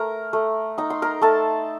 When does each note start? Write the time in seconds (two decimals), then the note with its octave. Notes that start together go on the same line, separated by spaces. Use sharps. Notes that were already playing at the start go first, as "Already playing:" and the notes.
Already playing: A3 A#4 A#5
0.33 A3
0.78 D#4 A#5
0.90 C6
1.02 A#4 A#5
1.21 A3 A4 A5